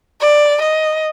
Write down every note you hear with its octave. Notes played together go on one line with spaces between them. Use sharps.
D5
D#5